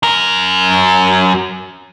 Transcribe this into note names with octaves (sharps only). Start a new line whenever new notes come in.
F#2 A#4